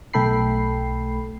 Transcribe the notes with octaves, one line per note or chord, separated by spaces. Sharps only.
B1 A3 A4 G5 B5 C7